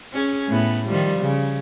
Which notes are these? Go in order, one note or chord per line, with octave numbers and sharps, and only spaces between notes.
C#4 G#4
A2 A3 B3
D#3 F3 G3
C#3